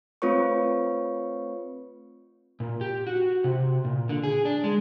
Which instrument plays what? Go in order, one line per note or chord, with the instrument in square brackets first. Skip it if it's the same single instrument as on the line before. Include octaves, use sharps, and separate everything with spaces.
[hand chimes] A3 C4 F4 B4 C#5 C#6
[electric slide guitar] A#2
G4
F#4
C3
A#2
D3
G#4
D4
G#3